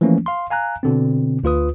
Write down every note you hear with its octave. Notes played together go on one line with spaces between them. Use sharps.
E3 F3 A3 A#3 C#4
F5 C6
F5 G#5 A#5 F#6
B2 D3 C4
D2 F4 B4 D#6